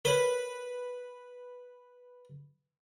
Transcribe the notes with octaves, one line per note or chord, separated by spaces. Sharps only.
A#4 B4 C#5 B5